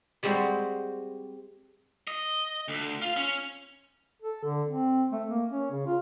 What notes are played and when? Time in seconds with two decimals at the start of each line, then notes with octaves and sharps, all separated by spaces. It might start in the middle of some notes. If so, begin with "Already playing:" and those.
0.23 G3 G#3 C4 F#4 C5
2.07 D#5
2.68 D2
3.02 F4
3.17 C#4
4.22 A4
4.44 D3
4.68 C4
5.12 A3
5.28 A#3
5.50 C#4
5.71 C#3
5.87 F4